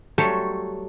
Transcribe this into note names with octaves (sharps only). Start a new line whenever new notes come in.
F#3 G3 A3 A4 C5 C#5